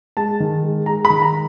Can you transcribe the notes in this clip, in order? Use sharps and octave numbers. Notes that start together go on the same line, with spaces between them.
G#3 A5
D#3
G#3
G#3 A#5
B5
D#3
A#5